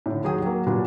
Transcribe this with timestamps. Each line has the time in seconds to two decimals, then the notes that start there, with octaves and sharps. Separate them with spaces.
0.06 A2 D3
0.24 D#2 F#3 G#4 G5 D#6
0.42 F#3 A#3
0.67 A#2 F#3 G3 B3 D4